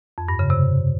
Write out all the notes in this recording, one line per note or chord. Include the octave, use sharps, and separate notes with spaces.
F2
G2
C#3
C3